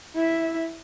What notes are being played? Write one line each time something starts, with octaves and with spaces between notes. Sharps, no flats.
E4 E5